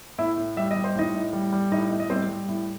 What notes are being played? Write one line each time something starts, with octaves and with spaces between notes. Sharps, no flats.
A2 E4 E5
A2
G3 E5
D#5
G3
C5
A2 D#4 D#5
A2
G3
G3
A2 D#4 D#5
A2
D#5
G3 C4 C5
G3
A2